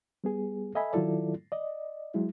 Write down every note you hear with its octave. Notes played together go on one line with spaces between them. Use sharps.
G3 B3 G#4
A4 D#5 E5 G#5 B5
D#3 F#3 E4 F4 A4 D5
D5 D#5
F#3 G#3 E4